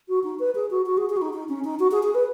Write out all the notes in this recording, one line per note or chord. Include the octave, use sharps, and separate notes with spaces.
F#4
D#4
B4
G#4
F#4
F#4
G#4
G#4
F#4
D#4
D#4
C#4
D#4
F#4
G#4
G#4
B4